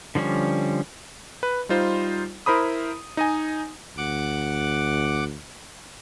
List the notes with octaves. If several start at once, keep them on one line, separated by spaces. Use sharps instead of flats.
D3 F3 G3 C#4
B4
G3 D#4 F4 C5
E4 A#4 C5 B5 D#6
D#4 D#5 G#5
D2 F#5 D6